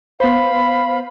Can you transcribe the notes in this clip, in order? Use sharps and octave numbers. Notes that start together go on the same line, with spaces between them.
B3 C5 F5 B5